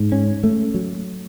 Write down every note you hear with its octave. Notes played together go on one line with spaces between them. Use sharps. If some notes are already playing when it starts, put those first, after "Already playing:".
Already playing: G#2
C#4
A3
F#3